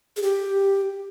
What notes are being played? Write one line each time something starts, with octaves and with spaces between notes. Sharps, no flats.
G#4
G4